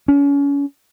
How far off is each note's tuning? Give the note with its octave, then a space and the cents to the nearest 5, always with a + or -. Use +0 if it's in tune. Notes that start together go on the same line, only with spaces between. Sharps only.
C#4 +30